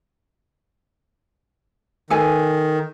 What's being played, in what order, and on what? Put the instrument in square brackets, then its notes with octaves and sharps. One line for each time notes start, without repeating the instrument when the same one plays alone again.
[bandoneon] D#3 [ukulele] A4 B4 G#5